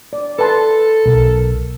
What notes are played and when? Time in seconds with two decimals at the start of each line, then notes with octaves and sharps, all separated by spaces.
0.13 D5
0.39 A4 B4 A5 C6
1.06 B1 A#4